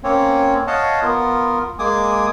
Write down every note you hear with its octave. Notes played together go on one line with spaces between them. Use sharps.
A#3 C4 C#4 C#5
C#5 D#5 F5 F#5 A5
B3 F4 A#4
G#3 A#3 G#5 D6 D#6